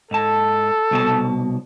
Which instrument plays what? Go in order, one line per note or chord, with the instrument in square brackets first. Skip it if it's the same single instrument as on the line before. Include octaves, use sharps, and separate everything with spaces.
[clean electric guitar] G#2 A5 [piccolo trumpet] A4
[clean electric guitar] C2 B2 A5